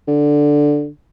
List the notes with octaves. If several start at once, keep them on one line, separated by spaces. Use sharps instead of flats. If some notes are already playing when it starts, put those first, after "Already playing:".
D3